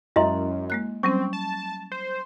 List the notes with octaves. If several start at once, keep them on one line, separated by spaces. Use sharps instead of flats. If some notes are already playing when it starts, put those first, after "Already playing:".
F#2 G#3 E4 D#5 E5 C6
G#3 A#3 F#6
F#3 G3 C4 C#4 C#6
A5
C5